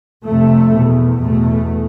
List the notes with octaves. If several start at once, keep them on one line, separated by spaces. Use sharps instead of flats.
F2 C3 A3
E2 B2
E2 B2 A3